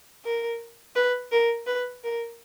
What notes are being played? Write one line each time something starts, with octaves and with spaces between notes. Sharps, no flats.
A#4
B4
A#4
B4
A#4